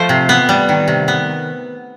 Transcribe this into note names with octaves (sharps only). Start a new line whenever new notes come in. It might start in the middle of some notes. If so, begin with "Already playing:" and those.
Already playing: F3 A3 C5
C3
B3
G3
D#3
C3
B3